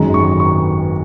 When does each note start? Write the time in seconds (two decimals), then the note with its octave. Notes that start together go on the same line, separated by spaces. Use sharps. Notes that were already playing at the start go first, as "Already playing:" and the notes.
Already playing: G#1 F#2 D#3 G#3 A#5
0.14 C#6
0.40 C#6